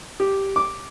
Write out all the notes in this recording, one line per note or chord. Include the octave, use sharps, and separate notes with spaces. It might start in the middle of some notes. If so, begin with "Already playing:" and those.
G4
D6